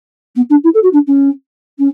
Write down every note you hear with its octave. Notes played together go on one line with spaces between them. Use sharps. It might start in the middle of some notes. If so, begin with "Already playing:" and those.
B3
D4
E4
A4
F#4
D4
C#4
C#4